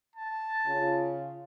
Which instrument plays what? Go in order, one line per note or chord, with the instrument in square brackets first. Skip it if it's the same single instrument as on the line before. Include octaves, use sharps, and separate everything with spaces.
[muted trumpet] A5
[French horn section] C#3 F4